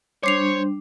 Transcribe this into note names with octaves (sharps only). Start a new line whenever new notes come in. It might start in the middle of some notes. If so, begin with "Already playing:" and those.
G3 D4 C5 C#5 D6 C7 F7